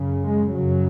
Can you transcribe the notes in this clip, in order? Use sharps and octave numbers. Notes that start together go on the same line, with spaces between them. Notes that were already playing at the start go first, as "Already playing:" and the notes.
Already playing: F#2 C#3
G#3
F#2 C#3 F#3